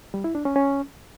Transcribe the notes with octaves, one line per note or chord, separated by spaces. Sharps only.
G3
E4
D4
C#4
C#4